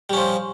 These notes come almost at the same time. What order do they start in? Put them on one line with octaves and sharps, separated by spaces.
G3 C#4 F3